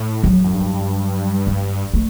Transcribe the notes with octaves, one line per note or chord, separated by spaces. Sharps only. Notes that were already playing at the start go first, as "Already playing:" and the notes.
Already playing: A2
F#3
F#2
G2
G3
A3